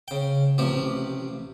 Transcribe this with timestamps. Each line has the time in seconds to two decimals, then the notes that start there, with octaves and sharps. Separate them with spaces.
0.08 C#3 G5
0.58 A1 C3 F3 G4